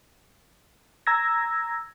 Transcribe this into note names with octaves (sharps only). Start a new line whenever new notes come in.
A#5 E6 G#6 A#6